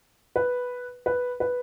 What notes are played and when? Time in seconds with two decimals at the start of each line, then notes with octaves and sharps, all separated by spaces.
0.36 B4
1.06 B4
1.40 B4